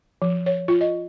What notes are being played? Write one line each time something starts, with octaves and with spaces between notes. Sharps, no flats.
F3
C#5
F4
D#5